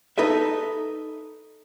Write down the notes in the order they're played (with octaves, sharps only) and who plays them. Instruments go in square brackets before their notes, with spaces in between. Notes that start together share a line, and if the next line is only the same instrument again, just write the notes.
[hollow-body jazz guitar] D#4 A4 B4 E5